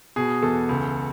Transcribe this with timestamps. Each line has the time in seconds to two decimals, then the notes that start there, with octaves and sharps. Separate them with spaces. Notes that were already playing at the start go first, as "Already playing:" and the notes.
0.16 B2 G#4
0.42 E2 A4
0.69 C#2